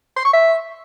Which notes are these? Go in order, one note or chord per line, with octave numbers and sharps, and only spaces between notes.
C6
C#6
E5